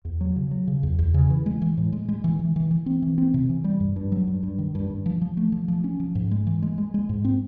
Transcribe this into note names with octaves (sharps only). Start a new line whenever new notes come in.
E2
F#3
C#3
F#3
C#3
E2
E2
C#3
E3
G#3
E3
A2
G#3
G#3
E3
E3
E3
E3
C4
E3
C4
C3
E3
G3
G2
G2
F#3
G2
G2
D#3
G2
G2
F3
F3
A3
F3
F3
C#4
F3
G#2
G#3
E3
G#3
G#3
G#3
G#2
C4